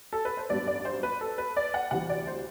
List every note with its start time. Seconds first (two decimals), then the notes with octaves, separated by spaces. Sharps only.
0.13 A4
0.25 B4
0.37 C5
0.50 A1 G2 F#3 B3 D4 D5
0.67 D5
0.85 C5
1.03 B4
1.21 A4
1.38 B4
1.56 D5
1.74 F#5
1.91 D2 C3 E3 G3 F#5
2.09 D5
2.27 C5